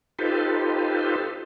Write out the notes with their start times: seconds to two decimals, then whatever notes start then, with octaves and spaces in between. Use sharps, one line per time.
0.19 D#4 F4 G4 A4 B4 C5